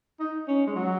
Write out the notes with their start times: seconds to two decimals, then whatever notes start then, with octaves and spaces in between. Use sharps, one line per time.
0.20 D#4
0.48 C#4
0.67 G#3
0.76 F#3